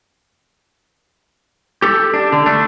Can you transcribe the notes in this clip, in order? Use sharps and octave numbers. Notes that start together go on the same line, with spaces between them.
G4 A4
D4
D3
A3 D4